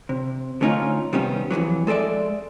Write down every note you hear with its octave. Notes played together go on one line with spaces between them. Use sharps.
C3
D3 A3 C#4 D#4 F4 C#5
C3 D#3 G3 B3 C#4
F2 B2 E3 F#3
G#3 A4 B4 D5 E5